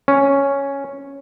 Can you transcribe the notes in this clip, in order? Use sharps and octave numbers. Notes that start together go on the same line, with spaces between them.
C#4